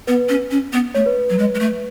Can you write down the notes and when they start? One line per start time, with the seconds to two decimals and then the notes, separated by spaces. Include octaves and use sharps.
0.07 B3 B4
0.29 C#4
0.51 C#4
0.73 B3
0.94 A3 C#5
1.06 B4
1.30 F#3
1.39 G#3
1.55 G#3
1.59 A3